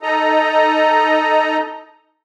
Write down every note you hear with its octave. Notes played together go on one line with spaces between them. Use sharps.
D#4 A4 D#5 A#5